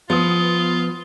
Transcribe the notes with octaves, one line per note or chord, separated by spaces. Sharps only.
F3 B3 F4 D#6